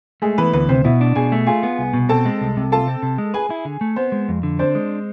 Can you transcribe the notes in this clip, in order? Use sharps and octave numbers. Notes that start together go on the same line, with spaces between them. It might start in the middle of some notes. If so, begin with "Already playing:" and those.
G#3 A3 G#4
E3 B3 B4
D2 B3 B4
C3 C4 C5
B2 E4 E5
D4
B2 G#4 G#5
A3
F4 G#4 G#5
B3
C2
B2
C4 A4 A5
G#3
C2
C3
F4 A4 A5
C4
C3
G#3
G#4 B4 G#5
E4
D3
A3
B3 C4 C5
G#3
F2
D3
C4 D4 C5
G#3